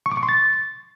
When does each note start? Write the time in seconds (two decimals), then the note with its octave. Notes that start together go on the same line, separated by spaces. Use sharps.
0.06 C#6
0.12 D6
0.17 C#6
0.23 C6
0.29 A6